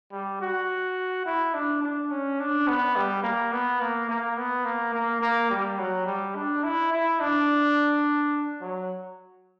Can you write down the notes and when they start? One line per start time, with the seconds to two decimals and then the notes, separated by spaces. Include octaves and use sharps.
0.12 G3
0.41 F#4
1.25 E4
1.54 D4
1.82 D4
2.11 C#4
2.39 D4
2.67 B3
2.96 G3
3.23 A#3
3.52 B3
3.81 A#3
4.09 A#3
4.37 B3
4.65 A#3
4.93 A#3
5.21 A#3
5.50 G3
5.79 F#3
6.06 G3
6.35 D4
6.64 E4
6.92 E4
7.20 D4
8.61 F#3